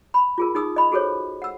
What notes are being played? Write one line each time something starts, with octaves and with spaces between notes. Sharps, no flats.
B5
F4 G#4 A#4
D#4 G#4 D#6 E6
D#5 B5
F#4 G#4 A4 C5 C#5
F#5 E6